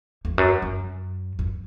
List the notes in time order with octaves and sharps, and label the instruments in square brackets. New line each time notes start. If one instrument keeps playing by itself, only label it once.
[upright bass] F2
F#2
F#2
F#2